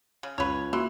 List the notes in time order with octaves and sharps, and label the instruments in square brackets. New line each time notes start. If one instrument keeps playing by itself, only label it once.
[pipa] C#3
[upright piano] C#2 [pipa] B4 C#5
[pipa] E3 [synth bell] A#3 F#4 C6